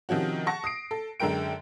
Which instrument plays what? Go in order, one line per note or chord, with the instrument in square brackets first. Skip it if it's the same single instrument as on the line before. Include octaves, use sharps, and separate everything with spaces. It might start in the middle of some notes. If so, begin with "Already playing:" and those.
[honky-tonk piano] C3 D#3 F3 C#4 F#4
F#5 A5 C#6 A#6
D#6 C7 D7
A4
F#2 D3 G#3 A#4 G5 D7